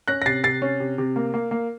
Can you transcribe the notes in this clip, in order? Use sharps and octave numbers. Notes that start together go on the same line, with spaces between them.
C#4 F#6 A#6
A#6
C3 A6 C7
C3 A6 C7
C#4
C3
C3
A#3
A#3
A#3